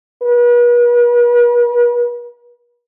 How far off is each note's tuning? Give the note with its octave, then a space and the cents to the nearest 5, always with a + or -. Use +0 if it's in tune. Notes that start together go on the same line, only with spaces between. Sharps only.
B4 -45